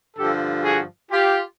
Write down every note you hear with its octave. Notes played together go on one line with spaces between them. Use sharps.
G2 D3 F3 G4 A4
F#4 G#4
F4 G4